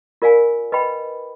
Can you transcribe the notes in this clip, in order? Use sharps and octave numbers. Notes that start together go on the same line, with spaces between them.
F4 A#4 D5 F5 G#5
B4 D#5 G5 B5